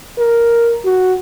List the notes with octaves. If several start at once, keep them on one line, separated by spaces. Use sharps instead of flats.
A#4
F#4